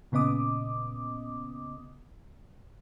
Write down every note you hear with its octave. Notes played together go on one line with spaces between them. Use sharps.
A#2 C#3 B3 D#5 D6 D#6